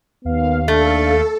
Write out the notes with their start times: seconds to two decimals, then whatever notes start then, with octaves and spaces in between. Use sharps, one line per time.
0.25 D#2 B3 F5
0.68 A3 D4 A4